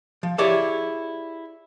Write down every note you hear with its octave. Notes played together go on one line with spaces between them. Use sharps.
F3
E4 G4 G#4 C#5 D5 E5